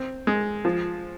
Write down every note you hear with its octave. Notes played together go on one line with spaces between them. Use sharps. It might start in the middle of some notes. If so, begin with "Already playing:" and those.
Already playing: C4
G#3
F3